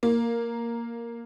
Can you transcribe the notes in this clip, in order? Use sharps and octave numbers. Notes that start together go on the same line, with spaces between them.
A#3